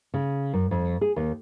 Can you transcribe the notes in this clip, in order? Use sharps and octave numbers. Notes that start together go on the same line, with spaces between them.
C#3
F#2
F2
G#4
D#2